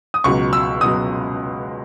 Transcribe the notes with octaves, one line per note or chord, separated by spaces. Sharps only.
D#6
C#2 B2 F#3 C#6
E6
B2 F#3 D#6